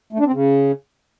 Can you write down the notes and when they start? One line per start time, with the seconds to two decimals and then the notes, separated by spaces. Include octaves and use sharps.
0.13 A3
0.19 D4
0.26 C4
0.33 C#3